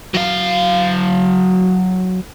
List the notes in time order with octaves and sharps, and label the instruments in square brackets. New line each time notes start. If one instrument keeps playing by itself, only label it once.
[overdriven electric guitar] F#3 F5